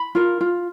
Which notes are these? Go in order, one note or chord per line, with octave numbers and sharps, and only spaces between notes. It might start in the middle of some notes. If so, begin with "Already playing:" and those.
Already playing: B5
F4 A#4
F4